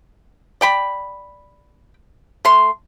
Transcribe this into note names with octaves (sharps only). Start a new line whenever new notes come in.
D5 G5 B5
A3 C6